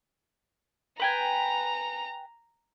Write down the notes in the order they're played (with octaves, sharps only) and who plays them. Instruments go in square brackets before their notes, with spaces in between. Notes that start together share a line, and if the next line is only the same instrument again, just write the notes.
[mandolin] B4 G5 G#5 [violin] A#5